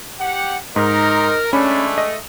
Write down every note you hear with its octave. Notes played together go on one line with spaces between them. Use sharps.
G4 F#5
G#2 D#4 A#4
G#3 A3 C#4 D4 B5
D#5